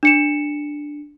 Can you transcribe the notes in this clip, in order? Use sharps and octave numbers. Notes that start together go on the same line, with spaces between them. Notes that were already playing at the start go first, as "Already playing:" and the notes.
D4 C#7 E7